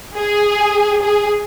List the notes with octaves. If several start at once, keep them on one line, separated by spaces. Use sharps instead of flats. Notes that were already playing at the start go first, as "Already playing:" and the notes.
G#4
G#4